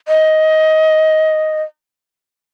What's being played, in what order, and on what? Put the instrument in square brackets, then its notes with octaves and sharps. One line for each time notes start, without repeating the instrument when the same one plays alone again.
[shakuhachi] D#5